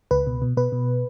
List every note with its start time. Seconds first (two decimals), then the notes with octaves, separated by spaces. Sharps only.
0.11 C#2 B4
0.27 B2
0.42 B2
0.57 B2 B4
0.72 B2